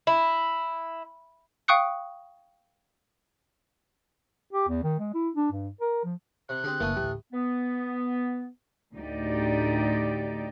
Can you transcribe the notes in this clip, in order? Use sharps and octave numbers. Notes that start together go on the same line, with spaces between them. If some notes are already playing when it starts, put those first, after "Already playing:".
E4
F5 G5 C#6 D#6 F#6 C#7
G4
E2
D#3
G#3
E4
D4
G2
A#4
F3
C3 F#6
D3 C4 G4 G#4
F#1 E3 A3 A#3 D#6
A1 D2 G4
B3
D2 A2 D#4 G4 D5